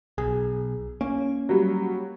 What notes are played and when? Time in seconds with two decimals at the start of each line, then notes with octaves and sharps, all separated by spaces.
0.18 B1 G#4
1.01 A#3 C#4
1.49 F#3 G3